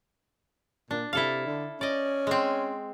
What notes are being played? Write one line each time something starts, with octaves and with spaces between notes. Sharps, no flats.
A#2 D4
C3 E4 A4 F5
D3
C#4 D5 D#5
G#3 C4